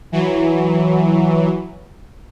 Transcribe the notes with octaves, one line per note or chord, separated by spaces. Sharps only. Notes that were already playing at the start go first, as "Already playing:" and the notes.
E3 F#3